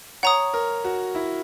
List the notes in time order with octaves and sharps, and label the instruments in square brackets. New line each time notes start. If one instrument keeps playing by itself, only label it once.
[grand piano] C#5 [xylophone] F#5 A#5 D#6
[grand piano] A#4
F#4
E4